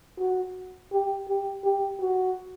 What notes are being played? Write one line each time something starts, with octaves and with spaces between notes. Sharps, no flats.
F#4
G4
G4
G4
F#4